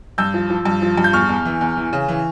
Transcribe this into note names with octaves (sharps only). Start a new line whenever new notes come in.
G2 E6 G6
F3
F3
G2
F3
G2
G6
E2 C#6 F6
E2
E3
E2
E3
C#3
E3